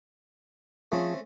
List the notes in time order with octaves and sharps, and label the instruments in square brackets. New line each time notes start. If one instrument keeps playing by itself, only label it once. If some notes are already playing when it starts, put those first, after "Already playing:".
[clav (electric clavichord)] F3 G#4 [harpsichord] A3 C4 C#4